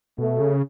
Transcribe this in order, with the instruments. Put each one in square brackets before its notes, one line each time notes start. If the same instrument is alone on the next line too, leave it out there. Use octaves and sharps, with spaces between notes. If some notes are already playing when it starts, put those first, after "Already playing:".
[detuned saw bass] B2 [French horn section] A3
[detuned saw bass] C#3